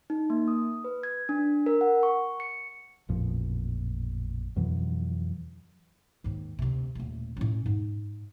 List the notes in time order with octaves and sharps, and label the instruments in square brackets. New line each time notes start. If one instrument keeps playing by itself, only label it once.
[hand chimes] D#4
A#3
D#6
B4
G#6
D4
A#4
F#5
C#6
C#7
[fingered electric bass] A1 F2 A#2 F3
F2 B2 E3 F#3
[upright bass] D#2 G#2
D2 C3
D#1 A3
A2 C#4
G#2